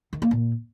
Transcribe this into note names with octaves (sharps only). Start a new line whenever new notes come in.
D#3
A#3
A#2